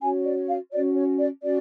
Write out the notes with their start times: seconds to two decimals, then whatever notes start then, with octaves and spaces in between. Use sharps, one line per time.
0.01 C#4 F#4 C#5 G#5
0.25 D5
0.48 F5
0.72 C#4 F#4 C#5 D5
0.95 C#5
1.18 D5
1.42 C#4 F#4 D5